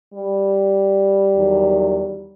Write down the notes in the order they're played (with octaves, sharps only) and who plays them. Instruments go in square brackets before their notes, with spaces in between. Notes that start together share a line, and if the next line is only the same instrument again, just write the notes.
[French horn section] G3
E2 D#3 F#3